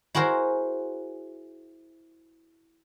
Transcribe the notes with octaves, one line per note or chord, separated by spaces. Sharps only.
E4 F#4 G#4 A#4 C5